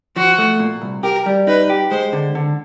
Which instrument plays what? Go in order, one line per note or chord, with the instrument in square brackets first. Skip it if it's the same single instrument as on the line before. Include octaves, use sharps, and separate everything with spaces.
[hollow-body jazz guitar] F3 [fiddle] F#4
[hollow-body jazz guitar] A3
A#2
C2
[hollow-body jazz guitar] G4 [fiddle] A#4
[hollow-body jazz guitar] G3
[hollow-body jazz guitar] D#4 [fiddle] B4
[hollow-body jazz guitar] G4
[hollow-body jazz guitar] G#3 [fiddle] C5
[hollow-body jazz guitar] D3
D3